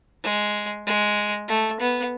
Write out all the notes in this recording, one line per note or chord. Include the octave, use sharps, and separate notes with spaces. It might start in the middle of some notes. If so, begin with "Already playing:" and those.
G#3
G#3
A3
B3